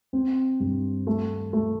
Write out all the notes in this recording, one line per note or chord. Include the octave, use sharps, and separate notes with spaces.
C4
G2
A3
A3